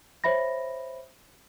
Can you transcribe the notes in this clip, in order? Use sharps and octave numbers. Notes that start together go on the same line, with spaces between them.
C5 C#5 E5 B5 A#6